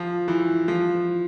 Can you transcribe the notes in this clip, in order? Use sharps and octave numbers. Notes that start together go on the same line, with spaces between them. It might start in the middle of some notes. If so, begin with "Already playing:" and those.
Already playing: F3
E3
F3